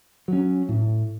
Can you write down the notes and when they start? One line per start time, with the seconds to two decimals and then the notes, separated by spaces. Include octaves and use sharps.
0.28 F#3 C#4
0.69 A2